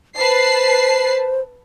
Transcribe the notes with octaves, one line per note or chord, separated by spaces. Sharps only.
B4 C5 A5 C7